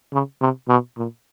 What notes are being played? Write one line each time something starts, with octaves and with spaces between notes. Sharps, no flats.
C#3
C3
B2
A#2